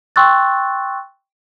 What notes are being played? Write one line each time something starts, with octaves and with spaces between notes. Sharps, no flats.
G5 C6 C#6 E6 F#6 A6